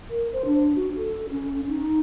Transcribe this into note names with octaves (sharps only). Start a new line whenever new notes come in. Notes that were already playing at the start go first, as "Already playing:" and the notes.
A#4
C5
D4
F#4
A4
C#4
D#4